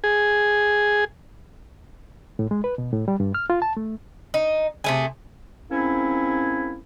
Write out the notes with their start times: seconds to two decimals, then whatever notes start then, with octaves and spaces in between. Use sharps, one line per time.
0.04 G#4
2.39 A2
2.51 G#3
2.64 B4
2.78 B2
2.93 A2
3.08 G3
3.20 G2
3.35 F6
3.50 F4
3.62 A5
3.77 A3
4.34 D#4
4.84 C3 A3 G#4
5.70 G#2 A#3 C4 C#4 E4